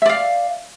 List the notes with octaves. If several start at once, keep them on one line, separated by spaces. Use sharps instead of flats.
D5 E5 F5